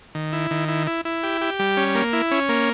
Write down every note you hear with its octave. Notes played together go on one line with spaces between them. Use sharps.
D#3
E4
D#3
E4
E4
E4
G4
G4
G3
C#4
A#3
E4
C#4
A#3